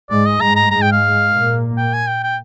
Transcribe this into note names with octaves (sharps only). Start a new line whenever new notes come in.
G#2 G#3 D5
D#5
G#2 G#3 A#5
A#5
G#2 G#3 A#5
G5
F5
A#2 A#3
G5
G#5
G5
G5